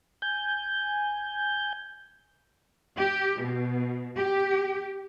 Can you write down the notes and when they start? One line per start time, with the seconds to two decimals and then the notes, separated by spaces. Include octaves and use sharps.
0.22 G#5 G6
2.97 G4
3.42 B2
4.17 G4